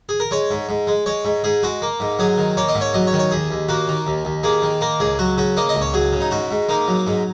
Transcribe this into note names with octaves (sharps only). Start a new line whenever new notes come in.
G#4
A#4
G#3 C#5
G#2
G#2
G#3
G#3 C#5
G#2
G#2 G#4
G#3 F#4
A#3
G#2
F#3 G#4
D#3
A#3 C#5
D#5
G#2
C#5
F#3 D#5
C#5
D#3
C#5
D#2 G#4
D#2
A#3 F#4
D#3
D#2
D#2
A#3 G#4
D#3
A#3 A#4
C#2 G#4
F#3 F#4
C#3 F#4
A#3 D#5
D#5
C#2
C#5
F#3 G#4
C#3
D#4
G#2 F#4
G#2
A#3 D#4
F#3
G#2